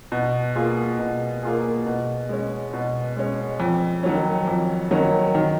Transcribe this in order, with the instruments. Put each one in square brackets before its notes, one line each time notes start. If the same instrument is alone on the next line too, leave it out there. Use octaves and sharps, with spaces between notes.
[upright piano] B2
A#3 F4 G#4
B2
A#3 F4 G#4
B2
G#3 C#4
B2
G#3 C#4
F2
D#3 F#3 C#4
F2
D#3 F#3 C#4
D#3